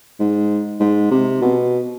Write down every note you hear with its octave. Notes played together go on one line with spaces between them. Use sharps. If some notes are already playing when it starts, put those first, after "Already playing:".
G#2
G#2
C3
B2